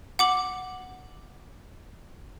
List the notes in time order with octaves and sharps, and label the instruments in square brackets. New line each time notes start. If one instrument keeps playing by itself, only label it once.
[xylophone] F#5 D6 F#7